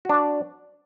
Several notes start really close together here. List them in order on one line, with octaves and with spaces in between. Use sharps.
F#4 D4 D5